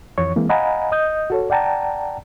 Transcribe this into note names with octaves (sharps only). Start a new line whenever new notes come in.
F2 E3 C#5 C#6
E3 G#3 A#3 C4
D#5 F5 F#5 G#5 A#5 B5
D#5 D#6 G6
F#4 A4 C#5
D5 F#5 G5 A5 A#5